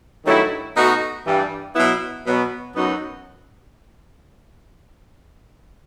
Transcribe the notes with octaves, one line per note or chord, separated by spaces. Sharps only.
G2 D#3 F#3 A3 E4
B2 A3 D#4 F#4
G2 E3 G3
B2 F#3 B3 E4
B2 F#3 B3
F#2 F#3 B3 D#4 F#4